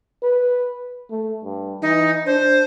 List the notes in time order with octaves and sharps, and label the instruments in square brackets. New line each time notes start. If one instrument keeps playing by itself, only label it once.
[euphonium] B4
A3
G2
[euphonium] E3 [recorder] D#4
[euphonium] D4 [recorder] C5